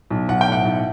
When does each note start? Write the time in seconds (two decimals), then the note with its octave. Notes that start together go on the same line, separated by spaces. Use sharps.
0.10 B1
0.28 B1 F#5
0.41 G5
0.47 A2 F#5
0.65 B1